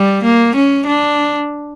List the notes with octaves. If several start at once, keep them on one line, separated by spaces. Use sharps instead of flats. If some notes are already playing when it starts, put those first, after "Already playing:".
Already playing: G3
A#3
C#4
D4